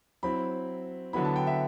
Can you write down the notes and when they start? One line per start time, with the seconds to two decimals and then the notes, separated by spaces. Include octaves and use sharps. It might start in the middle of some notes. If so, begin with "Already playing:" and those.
0.23 F#3 C4 E4 B5
1.13 D3 F#3 B3 E4 B5
1.25 A5
1.36 G5
1.47 E5